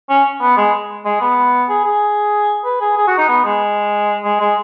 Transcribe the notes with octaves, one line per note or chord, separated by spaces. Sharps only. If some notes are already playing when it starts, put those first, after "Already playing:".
C#4
B3
G#3
G#3
B3
G#4
G#4
B4
G#4
G#4
F#4
D#4
B3
G#3
G#3
G#3